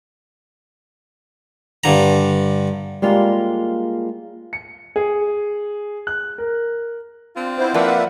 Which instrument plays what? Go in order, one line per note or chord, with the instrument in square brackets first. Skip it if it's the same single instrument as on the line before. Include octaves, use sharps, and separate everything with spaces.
[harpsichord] G2 D3 A#5
[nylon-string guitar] G3 G#3 A#3 F4
[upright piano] C#7
G#4
F#6
A#4
[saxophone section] C4 D4 F4
[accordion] B3 E4 C5
[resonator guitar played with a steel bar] F3 A#3 B4 [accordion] D5 E5 F#5